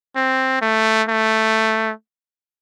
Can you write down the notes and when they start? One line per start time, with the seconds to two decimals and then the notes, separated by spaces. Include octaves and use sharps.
0.16 C4
0.62 A3
1.08 A3